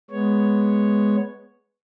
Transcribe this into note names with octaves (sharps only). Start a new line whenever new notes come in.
G#3 B3 C#5